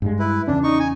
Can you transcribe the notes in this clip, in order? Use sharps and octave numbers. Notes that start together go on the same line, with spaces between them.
G2 G#3
E4 B4
E2 C#3 C#4 D4
D#4 C#6
G#5